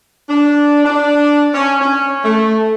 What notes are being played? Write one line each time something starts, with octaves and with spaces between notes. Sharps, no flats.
D4
D4
C#4
C#4
A3